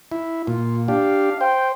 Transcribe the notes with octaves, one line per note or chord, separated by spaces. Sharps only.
E4
A#2 F4
D4 G4 F5
C5 G5